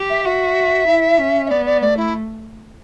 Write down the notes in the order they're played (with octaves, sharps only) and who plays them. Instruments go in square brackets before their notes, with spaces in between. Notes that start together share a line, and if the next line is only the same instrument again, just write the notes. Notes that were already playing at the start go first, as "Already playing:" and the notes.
Already playing: [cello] G4
[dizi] E5
[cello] F#4 [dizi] E5
[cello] E4
C#4
[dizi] E5
[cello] B3 [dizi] D5
[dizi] D5
[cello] A3 [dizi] D5
[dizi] E4